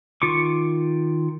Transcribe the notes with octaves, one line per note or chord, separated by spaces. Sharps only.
D#3 F4 C#6 D6